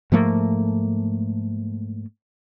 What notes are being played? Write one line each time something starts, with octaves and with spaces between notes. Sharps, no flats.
G#2 F3 A3 A#3